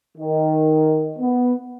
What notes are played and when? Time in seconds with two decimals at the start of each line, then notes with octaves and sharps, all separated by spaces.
0.18 D#3
1.19 B3